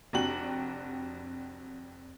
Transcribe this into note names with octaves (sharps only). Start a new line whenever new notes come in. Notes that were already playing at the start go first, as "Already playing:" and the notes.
F1 F2 D4 F#4 G4 F#7